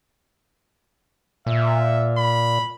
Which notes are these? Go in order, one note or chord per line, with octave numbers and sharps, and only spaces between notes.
A#2 E5
B5